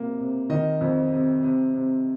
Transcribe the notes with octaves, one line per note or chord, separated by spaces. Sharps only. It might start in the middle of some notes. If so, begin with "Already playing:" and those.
Already playing: C3 A#3
C3
D#3 D#5
F2
C3
C3
C3